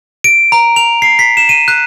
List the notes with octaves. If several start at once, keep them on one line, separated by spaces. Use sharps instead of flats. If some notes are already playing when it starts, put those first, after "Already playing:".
D7
A#5
F7
C7
B6
E7
D#7
F#6